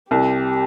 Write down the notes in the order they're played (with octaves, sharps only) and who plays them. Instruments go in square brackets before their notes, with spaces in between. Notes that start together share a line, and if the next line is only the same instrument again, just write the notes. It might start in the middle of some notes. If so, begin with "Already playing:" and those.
[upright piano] C2 [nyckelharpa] G4